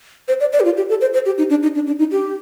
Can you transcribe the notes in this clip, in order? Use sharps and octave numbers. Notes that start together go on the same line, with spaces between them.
C5
D5
D5
G4
F4
G4
A4
C5
C5
G4
D#4
D4
D#4
D4
D4
D#4
G4